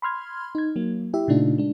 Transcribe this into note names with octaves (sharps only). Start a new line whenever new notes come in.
B5 C6 F6 G#6
D#4 G#6
F#3 A#3
E4 G4 E5
A#2 C#3 A3 D4 D#4 F4
G#3 D4